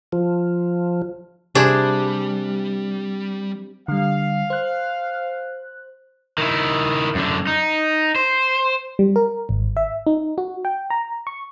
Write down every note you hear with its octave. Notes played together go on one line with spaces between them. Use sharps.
F3
C3 G3 D4 G#4 C5
D3 G3 F5
C5 F#6
D#3 E4
F#2 D3
D#4
C5
G3
A#4
G#1
E5
D#4
F#4
G5
A#5
C#6